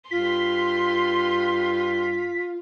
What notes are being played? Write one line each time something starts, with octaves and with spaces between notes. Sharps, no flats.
G2 F4 C6 B6